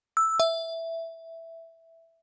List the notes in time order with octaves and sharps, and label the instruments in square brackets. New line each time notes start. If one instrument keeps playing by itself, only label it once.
[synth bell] E6
E5